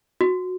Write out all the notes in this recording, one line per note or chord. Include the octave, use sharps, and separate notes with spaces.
F#4